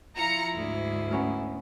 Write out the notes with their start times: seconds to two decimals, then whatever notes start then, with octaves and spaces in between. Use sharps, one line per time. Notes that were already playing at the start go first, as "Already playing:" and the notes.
0.16 F3 E4 F4 A#5 C#7
0.54 D2 G#2
1.11 B3 C#4 A#4